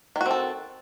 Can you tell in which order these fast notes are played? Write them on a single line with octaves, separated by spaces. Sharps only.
D#3 F#4 C4 A4